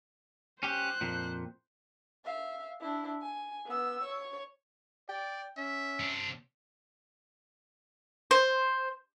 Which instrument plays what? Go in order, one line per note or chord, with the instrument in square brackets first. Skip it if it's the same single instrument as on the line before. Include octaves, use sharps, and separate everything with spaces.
[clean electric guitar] C#4 G4 [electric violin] C5 F#6
[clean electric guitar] F2 A#2
[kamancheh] E5 F5
D4 E4
G#5
B3 E6
C#5
[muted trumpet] D5 [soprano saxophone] G5
[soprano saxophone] C#4 [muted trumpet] E5
[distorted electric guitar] C3 D4
[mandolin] C5